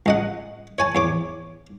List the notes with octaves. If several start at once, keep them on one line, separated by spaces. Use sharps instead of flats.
C#2 D#5 F#5
C#5 G#5 A5
E2 C#5 D6